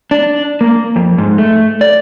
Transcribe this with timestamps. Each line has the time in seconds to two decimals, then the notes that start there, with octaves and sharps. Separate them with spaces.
0.11 D4
0.61 A#3
0.96 F2
1.18 G#2
1.38 A3
1.81 D5